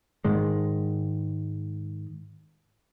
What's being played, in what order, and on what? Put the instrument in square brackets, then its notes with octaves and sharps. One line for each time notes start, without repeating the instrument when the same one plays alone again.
[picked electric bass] G#2 D#3 G#3